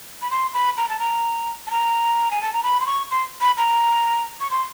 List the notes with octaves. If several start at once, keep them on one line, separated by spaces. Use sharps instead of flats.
B5
C6
B5
A#5
A5
A#5
A5
A#5
G#5
A5
A#5
B5
C6
C#6
C6
B5
A#5
C#6
C6